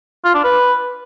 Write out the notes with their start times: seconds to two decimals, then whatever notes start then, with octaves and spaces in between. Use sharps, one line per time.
0.24 F4
0.34 D4
0.44 B4